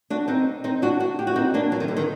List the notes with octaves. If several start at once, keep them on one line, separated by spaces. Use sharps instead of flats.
D4 F#4
C4 D#4
C4 D#4
D4 F#4
D4 F#4
G4
F#4
C4 D#4
A#3 D4
F#3
D#3
D3
D#3